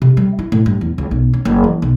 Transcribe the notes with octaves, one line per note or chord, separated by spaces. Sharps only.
C3
G3
E4
A2
G2
E2
C#2
B1
C#4
F#1
E3
B1